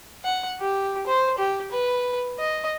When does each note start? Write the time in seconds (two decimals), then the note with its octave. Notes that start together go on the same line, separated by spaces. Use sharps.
0.24 F#5
0.60 G4
1.07 C5
1.38 G4
1.71 B4
2.39 D#5